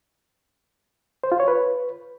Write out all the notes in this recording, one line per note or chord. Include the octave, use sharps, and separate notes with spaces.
C5
F4
C#5
B4